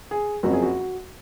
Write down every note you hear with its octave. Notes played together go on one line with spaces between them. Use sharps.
G#4
F#1 F2 F3 F#4
G#4
F#4